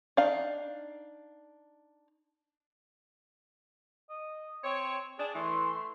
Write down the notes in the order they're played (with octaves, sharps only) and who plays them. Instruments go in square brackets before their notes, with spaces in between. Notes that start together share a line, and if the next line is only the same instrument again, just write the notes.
[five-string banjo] D4 D#4 F5
[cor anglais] D#5
[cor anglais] C4 [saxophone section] C#5
[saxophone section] D4 [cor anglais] G#4
[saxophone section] E3 [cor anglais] A3 [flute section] C6